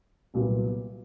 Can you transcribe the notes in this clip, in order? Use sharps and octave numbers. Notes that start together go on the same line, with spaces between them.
C2 A#2 F#3 B3